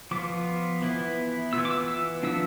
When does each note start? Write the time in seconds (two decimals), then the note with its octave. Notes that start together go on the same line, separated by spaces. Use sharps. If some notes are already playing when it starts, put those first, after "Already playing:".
0.11 F3 B3 F4 D6
0.82 E3 B3 E4
1.53 E3 B3 F4 E6
1.65 D6
1.71 E6
1.88 E6
2.23 F3 B3 D4 F4 E6